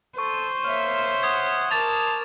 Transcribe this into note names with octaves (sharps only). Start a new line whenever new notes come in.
A4 C5 C#6
A#3 C#5 E5 F6
F#5 D#6 G#6
A#4 A5 D6 A6 F7